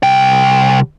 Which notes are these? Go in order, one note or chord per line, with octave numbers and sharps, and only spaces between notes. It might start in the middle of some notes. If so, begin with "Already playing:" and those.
C2 G5